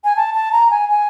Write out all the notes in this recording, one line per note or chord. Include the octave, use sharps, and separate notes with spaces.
G#5
A5
A5
A#5
G#5
G#5